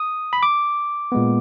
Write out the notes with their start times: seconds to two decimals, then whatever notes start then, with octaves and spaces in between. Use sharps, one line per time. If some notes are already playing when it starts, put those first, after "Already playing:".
Already playing: D#6
0.33 B5
0.43 D6
1.12 A#2 G#3 B3